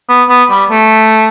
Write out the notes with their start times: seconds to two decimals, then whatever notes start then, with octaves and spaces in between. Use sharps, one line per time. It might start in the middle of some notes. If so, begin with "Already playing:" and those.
0.09 B3
0.29 B3
0.50 G3
0.71 A3